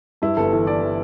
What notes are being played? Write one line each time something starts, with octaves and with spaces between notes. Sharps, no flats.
G2 E4
G1 A4
E3 A4
E3 D5
E3